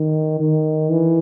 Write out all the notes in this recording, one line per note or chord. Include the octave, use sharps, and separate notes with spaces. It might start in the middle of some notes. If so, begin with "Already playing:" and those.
Already playing: D#3
D#3
E3